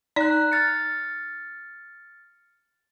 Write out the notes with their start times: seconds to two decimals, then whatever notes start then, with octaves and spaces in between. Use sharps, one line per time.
0.16 D#4 D5 A#5 F#6
0.52 F6 A6 C#7